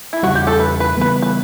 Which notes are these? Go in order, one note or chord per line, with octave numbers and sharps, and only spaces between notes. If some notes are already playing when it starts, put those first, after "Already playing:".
E4
E2 C#3 G3 F#4
G4
A4
B4
B4
C#3 E3 G3 B3 B4
B4